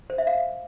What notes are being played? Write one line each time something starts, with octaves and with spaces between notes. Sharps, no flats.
C5
E5
F5